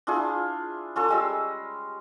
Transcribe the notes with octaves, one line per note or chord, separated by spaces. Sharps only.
D4 E4 F4 G#4
C#4 F4 A4
G3 G#3 E6